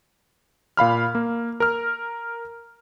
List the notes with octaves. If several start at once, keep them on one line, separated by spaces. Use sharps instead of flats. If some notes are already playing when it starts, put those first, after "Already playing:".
A#2 F5 B5 F6
A#3
A#4 F6